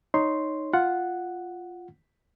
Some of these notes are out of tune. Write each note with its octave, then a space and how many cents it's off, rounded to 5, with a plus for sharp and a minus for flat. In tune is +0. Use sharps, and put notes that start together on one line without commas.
D#4 +0 C#5 +0 C6 +0
F4 +0 F#5 +0